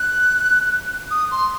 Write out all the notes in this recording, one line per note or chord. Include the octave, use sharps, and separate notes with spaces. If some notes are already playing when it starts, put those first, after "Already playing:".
Already playing: F#6
D#6
C6